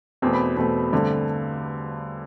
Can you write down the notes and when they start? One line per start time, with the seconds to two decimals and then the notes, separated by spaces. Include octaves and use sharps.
0.22 E2 B2 A3 C4
0.33 B5
0.57 E2 B2 A3 C4
0.92 G2 D3 A3 C4